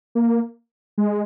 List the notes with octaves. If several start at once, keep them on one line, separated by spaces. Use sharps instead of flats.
A#3
G#3